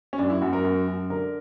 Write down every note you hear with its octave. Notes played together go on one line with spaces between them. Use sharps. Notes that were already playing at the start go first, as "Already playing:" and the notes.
C#4
F#2 D4
E4
F#2 F#4
A#4
F#2
F#2
D3 A#4